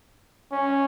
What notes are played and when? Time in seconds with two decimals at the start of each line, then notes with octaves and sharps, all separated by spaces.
0.52 C#4